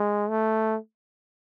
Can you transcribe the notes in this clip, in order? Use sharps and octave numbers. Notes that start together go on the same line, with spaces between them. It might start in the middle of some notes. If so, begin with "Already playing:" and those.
Already playing: G#3
A3